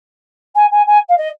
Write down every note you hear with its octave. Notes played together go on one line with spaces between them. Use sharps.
G#5
G#5
G#5
F5
D#5